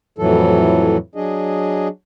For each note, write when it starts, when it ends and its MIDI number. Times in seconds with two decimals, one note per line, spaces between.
0.18 0.97 41
0.18 0.97 45
0.18 0.97 52
0.18 0.97 54
0.18 0.97 69
1.15 1.88 54
1.15 1.88 62
1.15 1.88 68
1.15 1.88 75